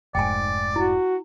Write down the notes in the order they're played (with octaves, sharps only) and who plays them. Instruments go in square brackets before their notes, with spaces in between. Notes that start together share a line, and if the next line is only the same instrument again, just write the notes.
[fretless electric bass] F1 G#2 [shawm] D5 [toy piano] G5 G#5
[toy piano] E4 [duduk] F#4